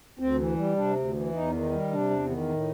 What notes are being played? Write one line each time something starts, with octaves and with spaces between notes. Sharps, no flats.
D2 C4
E3
G3
C3 D4
D2
E3
E2 D#4
D#3
G3
C3 D4
E2
D#3
A2